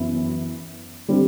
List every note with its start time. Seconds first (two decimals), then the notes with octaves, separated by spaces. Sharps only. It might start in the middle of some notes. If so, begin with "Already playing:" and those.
Already playing: F#2 E3 B3 E4
1.08 D3 G3 C4